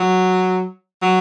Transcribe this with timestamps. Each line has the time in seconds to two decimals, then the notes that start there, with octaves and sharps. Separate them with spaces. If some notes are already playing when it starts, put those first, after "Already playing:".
Already playing: F#3
1.02 F#3